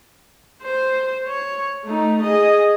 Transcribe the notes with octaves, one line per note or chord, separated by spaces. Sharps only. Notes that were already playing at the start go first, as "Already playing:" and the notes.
C5
C#5
A3 D#4
G#4 D#5